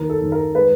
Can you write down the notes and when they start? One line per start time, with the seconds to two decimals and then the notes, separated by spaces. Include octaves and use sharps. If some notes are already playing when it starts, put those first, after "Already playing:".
Already playing: D#2 A#4
0.10 A4
0.21 D#2
0.32 A#4
0.55 G#3 B4